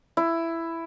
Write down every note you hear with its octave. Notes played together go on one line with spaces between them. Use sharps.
E4